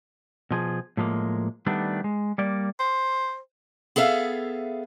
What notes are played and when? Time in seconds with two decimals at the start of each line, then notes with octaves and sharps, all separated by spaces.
0.51 B2 F3 G#4
0.97 A2 F3 G#3 A#3
1.66 D#3 G3 A3 B3 D4
2.04 G#3
2.38 G3 A#3 D5
2.80 C5
3.96 B3 G#4 A4 E5 F5